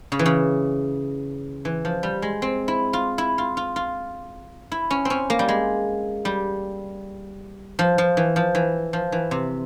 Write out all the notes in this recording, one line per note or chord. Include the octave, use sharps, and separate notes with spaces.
C#3
E3
C#3
E3
F3
G3
G#3
C4
E4
F4
E4
F4
F4
F4
E4
C#4
C4 C#4
A#3
G3
G#3
G3
F3
F3
E3
F3
E3
F3
E3
C3